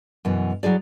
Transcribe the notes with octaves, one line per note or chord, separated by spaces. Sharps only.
F#2 B2 E3
F#3 E4 G#4 D5